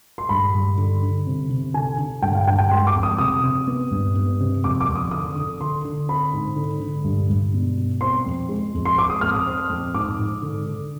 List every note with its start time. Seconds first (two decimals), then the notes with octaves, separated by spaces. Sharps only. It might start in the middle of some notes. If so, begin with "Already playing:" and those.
0.18 C6
0.29 G2 B5
0.54 G2
0.77 D3
1.03 D3
1.27 C3
1.50 C3
1.74 D3 G#5
1.98 D3
2.22 G2 G5
2.35 F5
2.47 G2 G5
2.59 G5
2.71 G#3 C6
2.87 D6
2.96 F2
3.03 D#6
3.19 C3 D#6
3.43 C3
3.68 B3
3.91 G2
4.16 B3
4.40 C3
4.64 F2 D6
4.80 D6
4.88 F2
4.95 D#6
5.11 D3 D#6
5.36 D3
5.61 D3 C6
5.85 D3
6.09 C4 B5
6.33 G#2
6.56 D3
6.80 D3
7.04 G2
7.29 G2
7.54 B2
7.78 B2
8.01 C4 C6
8.26 F2
8.49 G#3
8.74 F2
8.85 C6
8.97 C4 D6
9.10 D#6
9.21 F2 F6
9.34 D#6
9.47 C4
9.70 F2
9.94 G#2 D6
10.19 G#2
10.42 D3
10.67 D3